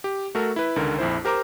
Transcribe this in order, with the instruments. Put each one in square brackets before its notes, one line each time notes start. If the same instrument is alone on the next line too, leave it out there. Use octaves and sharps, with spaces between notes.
[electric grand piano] G4
A3 F#4 A4 A#4
E4 B4
C#2 D3 D#3 A#4
A#1 F2 E4 C5
G4 A#4 C5 A#5 D6